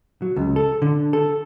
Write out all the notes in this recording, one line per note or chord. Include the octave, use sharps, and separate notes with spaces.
F#3
C#2
A4
D3
A4